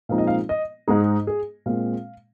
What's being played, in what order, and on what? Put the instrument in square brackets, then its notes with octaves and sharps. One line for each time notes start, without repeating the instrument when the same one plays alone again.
[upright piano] A#2 F3 G#3 C4 D#4 F5
D#5
F5
D#5
G#2 G#3 D#4 G#4
G#4
A#2 G#3 C4 F5